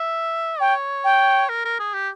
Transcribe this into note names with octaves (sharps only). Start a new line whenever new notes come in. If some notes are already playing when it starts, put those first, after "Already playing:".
Already playing: E5
C#5 G5
G5
A#4
A#4
G#4
G4